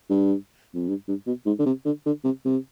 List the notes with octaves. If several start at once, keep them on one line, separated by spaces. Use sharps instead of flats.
G2
F2
G2
G2
B2
G#2
D3
C3
D3
D3
C3
C3